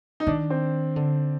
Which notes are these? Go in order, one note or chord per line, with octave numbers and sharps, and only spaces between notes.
D#4
D#3 D4
C4
D3